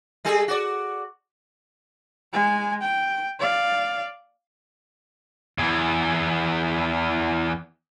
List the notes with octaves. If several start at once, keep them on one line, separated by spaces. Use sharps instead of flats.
G3 G#4 A4
F#4 D5
G#3 G#5
G5
D5 F5
E2 E3